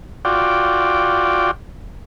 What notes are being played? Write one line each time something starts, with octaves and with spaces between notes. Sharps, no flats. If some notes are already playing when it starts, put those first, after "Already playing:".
F4 F#4 D5 G5